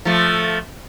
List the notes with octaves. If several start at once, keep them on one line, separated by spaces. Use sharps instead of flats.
F3 A3